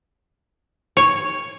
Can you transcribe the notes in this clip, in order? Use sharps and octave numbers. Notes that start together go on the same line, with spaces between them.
C#5